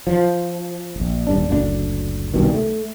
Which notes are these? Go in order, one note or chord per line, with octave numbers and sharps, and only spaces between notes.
F3
D1 A#1
D#1 G2 D4
F#1 D2 C#3 D4
C2 G2 B2 D#3
A3